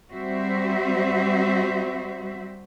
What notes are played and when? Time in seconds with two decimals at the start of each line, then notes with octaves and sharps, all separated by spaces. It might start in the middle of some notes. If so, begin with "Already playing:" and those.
0.11 G3 C4 F#4 C5 E5